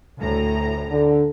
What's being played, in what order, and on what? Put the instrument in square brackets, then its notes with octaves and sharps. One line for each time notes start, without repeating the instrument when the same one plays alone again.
[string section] D2 A2 A#5
[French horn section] D3